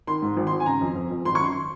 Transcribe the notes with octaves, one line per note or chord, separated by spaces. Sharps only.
D#3 C6
G#2
G#1
C6
G#1
G#5
C#3 A#5
F2
F2
F2
G#1 C6
C#6
F#2 C6